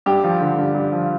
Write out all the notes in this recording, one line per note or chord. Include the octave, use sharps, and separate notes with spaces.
G2 G4
F3
D3
G2
G2
F3